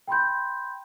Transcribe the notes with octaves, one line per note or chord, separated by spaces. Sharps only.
G5 B5 C6 G6